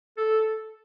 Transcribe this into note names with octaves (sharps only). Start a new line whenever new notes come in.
A4